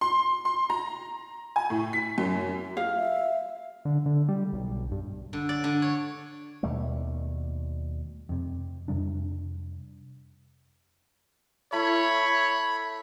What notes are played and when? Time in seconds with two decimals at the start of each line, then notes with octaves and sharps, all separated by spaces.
0.01 C6
0.45 C6
0.70 A#5
1.56 G#5
1.70 A2
1.93 B6
2.18 F#2
2.77 F4 F5
2.96 E5
3.85 D3
4.06 D3
4.28 G3
4.53 B1
4.92 G2
5.33 D3
5.49 D5
5.64 D3
5.82 C#5
6.63 D#2 B2 G3 A3
8.29 F2 C3
8.88 F2 C3 G3 D4
11.72 A3 E4 C#5 B5